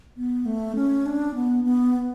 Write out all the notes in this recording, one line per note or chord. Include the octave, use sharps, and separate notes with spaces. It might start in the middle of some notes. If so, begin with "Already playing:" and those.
B3
A3
C#4
D4
B3
B3